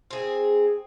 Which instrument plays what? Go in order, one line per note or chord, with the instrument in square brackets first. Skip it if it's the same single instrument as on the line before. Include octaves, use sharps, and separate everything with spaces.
[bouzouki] C4 G#4